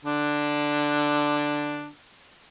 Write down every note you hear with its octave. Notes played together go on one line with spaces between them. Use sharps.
D3 D4